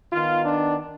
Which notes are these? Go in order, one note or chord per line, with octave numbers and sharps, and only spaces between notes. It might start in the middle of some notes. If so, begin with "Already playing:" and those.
D#3 B3 F4
D4